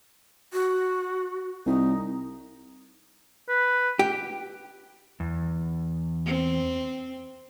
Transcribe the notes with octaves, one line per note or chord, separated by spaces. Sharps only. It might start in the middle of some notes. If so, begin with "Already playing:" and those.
F#4
C2 D#4
B4
G4
E2
C4